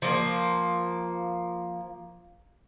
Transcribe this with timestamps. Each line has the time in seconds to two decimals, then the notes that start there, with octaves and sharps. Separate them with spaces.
0.02 F3 A#3